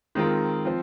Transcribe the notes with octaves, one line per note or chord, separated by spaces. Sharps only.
D#3 G#3 C4 F4 A#4
F3 C4 F4 C5